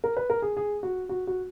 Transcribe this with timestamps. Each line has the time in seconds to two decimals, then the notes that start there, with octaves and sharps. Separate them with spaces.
0.04 A#4
0.17 B4
0.30 A#4
0.42 G#4
0.57 G#4
0.83 F#4
1.09 F#4
1.27 F#4